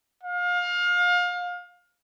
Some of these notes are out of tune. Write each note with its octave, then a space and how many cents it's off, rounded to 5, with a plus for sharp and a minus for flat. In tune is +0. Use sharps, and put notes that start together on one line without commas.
F5 +30